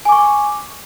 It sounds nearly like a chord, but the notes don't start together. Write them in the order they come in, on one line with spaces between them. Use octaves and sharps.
G#5 D6 C#6